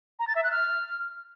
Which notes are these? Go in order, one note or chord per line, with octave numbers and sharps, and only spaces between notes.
A#5
A6
E5
F#6
F6